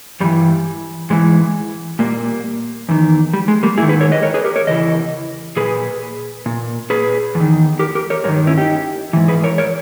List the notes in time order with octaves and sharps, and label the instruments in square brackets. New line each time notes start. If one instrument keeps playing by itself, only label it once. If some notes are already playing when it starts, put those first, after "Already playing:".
[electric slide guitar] G2 E3 G3
G#2 E3 G#3
A#2 G3 A#3
E2 D#3
G3
G#3
G3 A#3
G#2 D#3 E4 G#4
G#4 B4
A#4 C#5
B4 D#5
A#4 C#5
G#4 B4
G4 A#4
A#4 C#5
E2 C#3 E3 D#5
A#2 G#4 B4
A#2
G#4 B4
E2
D#3
G4 A#4
G4 A#4
A#4 C#5
G2 A#4 C#5
D#3
C#4 E4
D#4 G4
G#2 E3
G#4 B4
A#4 C#5
A#4 C#5